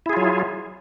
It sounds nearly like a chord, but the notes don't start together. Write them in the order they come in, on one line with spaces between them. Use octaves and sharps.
E4 G#4 F4 F#3